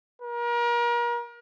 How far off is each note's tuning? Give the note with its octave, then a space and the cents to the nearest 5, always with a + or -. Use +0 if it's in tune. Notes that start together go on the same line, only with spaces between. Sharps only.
A#4 +35